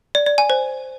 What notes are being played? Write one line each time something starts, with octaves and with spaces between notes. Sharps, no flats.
D5
D5
G#5
C5